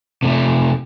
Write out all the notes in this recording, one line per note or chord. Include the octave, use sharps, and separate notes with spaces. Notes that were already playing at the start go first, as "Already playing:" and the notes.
C3 A3